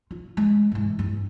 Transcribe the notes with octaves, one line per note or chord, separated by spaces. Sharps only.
F4
G#3
G#2 E3
G2